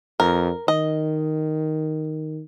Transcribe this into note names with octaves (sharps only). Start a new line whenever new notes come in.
F2 A#4
D#3 D#5